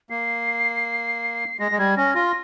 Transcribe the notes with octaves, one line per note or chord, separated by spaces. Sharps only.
A#3 C7
G#3 A#6
G#3
G3 G#6
C#4 A#6
F4 A#6